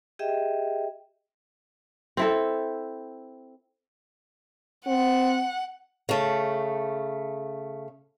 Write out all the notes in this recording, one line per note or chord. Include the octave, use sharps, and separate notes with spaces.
G4 G#4 D#5 E5 G5
C4 E4 A4
C4 F#5
C#3 A3